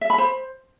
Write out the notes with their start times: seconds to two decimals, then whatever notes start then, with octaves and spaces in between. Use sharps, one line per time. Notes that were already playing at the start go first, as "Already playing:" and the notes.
0.01 E5
0.10 B5
0.18 C5